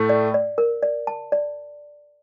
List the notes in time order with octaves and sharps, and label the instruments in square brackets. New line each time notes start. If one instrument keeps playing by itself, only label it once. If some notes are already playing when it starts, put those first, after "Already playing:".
Already playing: [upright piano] A2 A3
[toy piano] D5
D5
A#4
D5
A5
D5